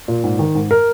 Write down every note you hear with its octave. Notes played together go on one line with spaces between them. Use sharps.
A#2
G#2
D#3
G#2
A#4